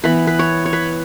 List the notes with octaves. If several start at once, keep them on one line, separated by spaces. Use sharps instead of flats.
E3 B3 B4
B4
C#5
C#5
B4